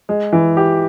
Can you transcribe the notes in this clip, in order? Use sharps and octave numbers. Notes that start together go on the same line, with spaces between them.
G#3
E3
G4